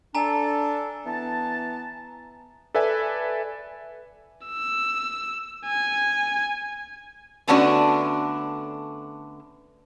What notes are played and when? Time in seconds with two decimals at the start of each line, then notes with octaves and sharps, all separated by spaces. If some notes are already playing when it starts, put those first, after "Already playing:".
0.15 D4 A4 G#5 A#5
1.06 E3 B3 A5
2.75 A4 B4 D5 E5 G#5
4.47 E6
5.66 G#5
7.47 D3 A3 B3 C#4 D4 F#4